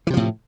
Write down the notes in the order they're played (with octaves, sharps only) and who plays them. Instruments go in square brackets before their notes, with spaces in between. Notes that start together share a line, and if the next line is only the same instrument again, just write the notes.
[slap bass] E3
C3
F3
A2